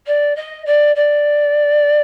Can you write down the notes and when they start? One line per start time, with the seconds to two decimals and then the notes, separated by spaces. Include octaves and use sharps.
0.06 D5
0.36 D#5
0.65 D5
0.95 D5